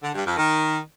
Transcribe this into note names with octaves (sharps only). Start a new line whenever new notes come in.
D3
G2
F2
D#3